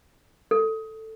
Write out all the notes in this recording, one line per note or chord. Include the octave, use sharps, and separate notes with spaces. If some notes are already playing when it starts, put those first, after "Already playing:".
A4